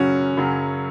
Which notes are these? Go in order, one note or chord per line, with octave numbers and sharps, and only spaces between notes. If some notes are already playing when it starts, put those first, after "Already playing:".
Already playing: F#2 C#3 F#3 C#4 F#4
F#2 C#3 F#3